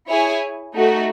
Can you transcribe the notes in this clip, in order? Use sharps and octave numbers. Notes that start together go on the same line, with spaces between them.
E4 G#4 C#5 G#5
A3 D#4 F#4